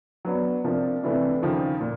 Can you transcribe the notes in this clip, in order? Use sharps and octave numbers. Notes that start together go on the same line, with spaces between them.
F#3 B3 D4
C3 F3 A#3 D4
C3 E3 A3 D4
D#2 C#3 F3
A#2